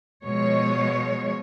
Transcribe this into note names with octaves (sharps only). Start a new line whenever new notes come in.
B2 F3 G#3 C#5